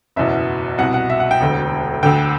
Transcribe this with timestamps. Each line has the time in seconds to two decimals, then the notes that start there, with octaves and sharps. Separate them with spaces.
0.16 F#1 E2 B2 E5
0.78 C2 B2 F#5
0.94 F#5
1.10 E5
1.20 F#5
1.31 G5
1.41 E1 D2 D3
2.03 D2 D3 G5